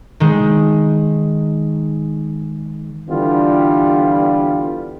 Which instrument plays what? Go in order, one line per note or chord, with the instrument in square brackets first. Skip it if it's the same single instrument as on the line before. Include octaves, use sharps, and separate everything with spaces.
[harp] D#3 G#3
[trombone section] D3 E3 G3 B3 D4 F4